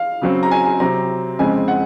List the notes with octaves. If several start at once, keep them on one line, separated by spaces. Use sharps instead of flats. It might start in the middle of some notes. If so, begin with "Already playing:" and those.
Already playing: F5
C#3 F#3 C4
A#5
G#5
G#5
C3 F#3 C4 A#5
F2 C#3 G#3 C4 G#5
F#5